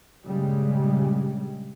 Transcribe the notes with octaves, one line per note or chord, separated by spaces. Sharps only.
G2 A#2 C#3 G3 G#3